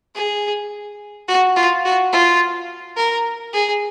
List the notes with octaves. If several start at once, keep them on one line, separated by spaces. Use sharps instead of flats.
G#4
F#4
F4
F#4
F4
A#4
G#4